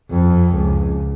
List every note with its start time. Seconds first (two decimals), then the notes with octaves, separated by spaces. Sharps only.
0.11 F2
0.56 C#2